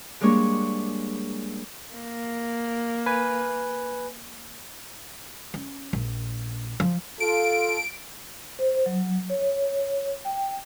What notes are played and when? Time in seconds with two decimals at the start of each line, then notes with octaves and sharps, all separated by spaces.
0.21 G3 G#3 A#3 D4 C#5
1.95 A#3
3.06 B4 G#5
5.54 C#4
5.93 A#1
6.80 F3
7.20 F4 A4 D7
8.59 C5
8.86 F#3
9.30 C#5
10.25 G5